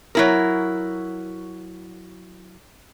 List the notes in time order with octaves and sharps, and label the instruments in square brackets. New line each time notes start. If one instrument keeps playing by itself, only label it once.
[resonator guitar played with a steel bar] F#3 E4 A#4